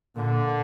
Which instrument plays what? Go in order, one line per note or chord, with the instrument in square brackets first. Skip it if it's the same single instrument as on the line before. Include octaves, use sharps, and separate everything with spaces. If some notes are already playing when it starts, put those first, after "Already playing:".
[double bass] A#2 [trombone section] D3